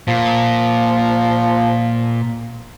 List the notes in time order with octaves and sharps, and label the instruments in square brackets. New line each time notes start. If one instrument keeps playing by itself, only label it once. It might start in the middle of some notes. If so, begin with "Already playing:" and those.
[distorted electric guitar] A#2 [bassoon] F3